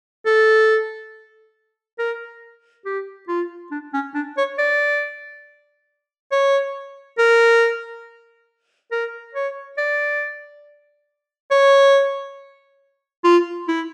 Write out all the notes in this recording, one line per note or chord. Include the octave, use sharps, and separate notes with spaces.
A4
A#4
G4
F4
D4
C#4
D4
C#5
D5
C#5
A#4
A#4
C#5
D5
C#5
F4
E4